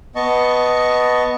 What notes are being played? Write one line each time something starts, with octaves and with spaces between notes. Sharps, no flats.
B3 D#5 A5 C#6